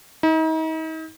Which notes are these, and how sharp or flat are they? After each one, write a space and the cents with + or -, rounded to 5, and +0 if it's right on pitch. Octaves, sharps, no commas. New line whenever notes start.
D#4 +40